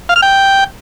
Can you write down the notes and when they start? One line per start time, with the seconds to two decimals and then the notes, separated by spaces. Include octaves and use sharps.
0.09 F5
0.16 F6
0.22 G5